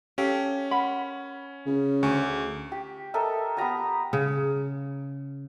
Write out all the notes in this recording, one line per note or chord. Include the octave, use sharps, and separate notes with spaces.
C#4 G4 A4 F5
A#4 F#5 B5
C#3
D2 G#5 C#6
G4
A4 A#4 D#5 E5
B3 G4 A#5 D#6
C#3